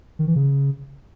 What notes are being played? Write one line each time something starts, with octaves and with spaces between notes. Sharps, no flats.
D#3
E3
C#3